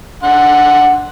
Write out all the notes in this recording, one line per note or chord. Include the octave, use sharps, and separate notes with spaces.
D3 F#5 C6